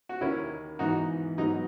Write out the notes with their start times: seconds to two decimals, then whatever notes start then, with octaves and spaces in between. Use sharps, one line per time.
0.09 F#4
0.21 D#2 D#3 A#3 C#4 E4
0.79 G#2 E3 B3 D#4 F#4
1.38 G#2 F#3 B3 D#4